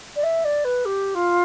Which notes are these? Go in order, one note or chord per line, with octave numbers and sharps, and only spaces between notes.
D5
E5
D5
B4
G4
F4